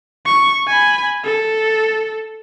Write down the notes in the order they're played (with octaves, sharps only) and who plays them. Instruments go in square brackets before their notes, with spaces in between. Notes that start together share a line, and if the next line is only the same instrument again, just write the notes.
[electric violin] C#6
G#5 B5
A4